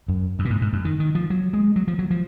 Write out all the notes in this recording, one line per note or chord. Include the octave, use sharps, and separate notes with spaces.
F#2
F#2
A#2
G#2
G#2
F#2
D#3
D#3
F3
F#3
G#3
F#3
F3
F#3
F3